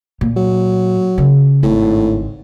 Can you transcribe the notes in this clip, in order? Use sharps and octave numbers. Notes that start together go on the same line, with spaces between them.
A#2
F#3
C#3
G#1 A2